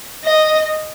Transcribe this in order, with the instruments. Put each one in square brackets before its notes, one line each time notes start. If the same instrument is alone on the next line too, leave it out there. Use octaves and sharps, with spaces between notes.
[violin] D#5